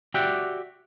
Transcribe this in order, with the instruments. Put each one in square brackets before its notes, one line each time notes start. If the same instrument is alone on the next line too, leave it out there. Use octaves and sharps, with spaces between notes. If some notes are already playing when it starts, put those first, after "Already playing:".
[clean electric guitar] F#4 G4 D5 E5 F#5 G5